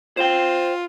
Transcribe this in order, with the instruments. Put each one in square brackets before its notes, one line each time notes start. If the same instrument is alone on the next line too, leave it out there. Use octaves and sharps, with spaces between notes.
[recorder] F4 [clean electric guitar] C5 G5